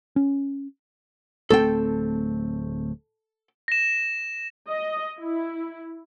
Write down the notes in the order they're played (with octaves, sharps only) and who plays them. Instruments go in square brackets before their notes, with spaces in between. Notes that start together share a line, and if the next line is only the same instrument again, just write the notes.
[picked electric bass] C#4
[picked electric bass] D1 A3 C4 [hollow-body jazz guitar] A4 G5
[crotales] A#6 E7
[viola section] D#5
E4